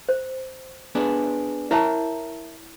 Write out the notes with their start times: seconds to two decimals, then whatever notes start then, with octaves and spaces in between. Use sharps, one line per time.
0.09 C5
0.95 B3 D4 G#4
1.71 E4 A#4 C#5 E5 A5 A#5